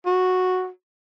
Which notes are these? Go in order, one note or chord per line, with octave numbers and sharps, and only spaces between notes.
F#4